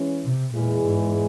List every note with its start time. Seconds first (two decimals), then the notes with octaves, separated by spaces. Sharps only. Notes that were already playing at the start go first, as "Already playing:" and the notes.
Already playing: E3 G#3 C#4
0.23 C3
0.53 E2 A#2 E3 G#3 E4 G#4
0.84 G#2